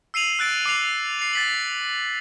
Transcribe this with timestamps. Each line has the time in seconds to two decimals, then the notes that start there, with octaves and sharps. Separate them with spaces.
0.14 E6 C7 D#7 F7 F#7
0.39 E6 F#6 A6 D7
0.66 D6 C7 F7
1.19 C7 F7
1.33 A6 B6 F#7